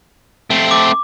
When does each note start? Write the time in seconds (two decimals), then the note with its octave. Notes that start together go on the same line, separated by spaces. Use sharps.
0.50 A3 C4
0.71 D6